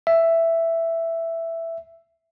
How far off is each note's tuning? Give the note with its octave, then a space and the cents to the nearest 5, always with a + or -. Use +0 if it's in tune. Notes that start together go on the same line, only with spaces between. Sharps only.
E5 +5